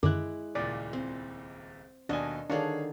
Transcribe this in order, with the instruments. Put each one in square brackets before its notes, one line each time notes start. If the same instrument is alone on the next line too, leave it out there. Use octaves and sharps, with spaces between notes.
[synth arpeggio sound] F#2 D3 D#3 [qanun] G#3 E4 [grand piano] D6 F#6
[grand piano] D#1 C#2 A#2 [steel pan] D5
[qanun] C4
[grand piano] D#2 B2 G#5 [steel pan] D4 [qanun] D#5
[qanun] D3 D#3 [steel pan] D4 [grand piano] G#4 C#5 F5